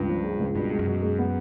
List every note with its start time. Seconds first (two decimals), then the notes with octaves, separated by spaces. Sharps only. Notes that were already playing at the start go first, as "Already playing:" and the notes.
Already playing: C#2 G2
0.09 F3
0.24 G#3
0.39 C#2
0.56 G2 B2
0.71 G#3
0.79 F#2
0.87 B2
1.02 G#3
1.19 B3